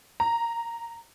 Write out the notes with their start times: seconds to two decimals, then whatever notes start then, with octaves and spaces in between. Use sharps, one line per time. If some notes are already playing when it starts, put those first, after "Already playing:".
0.20 A#5